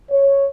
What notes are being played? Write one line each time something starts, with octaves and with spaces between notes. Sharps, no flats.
C#5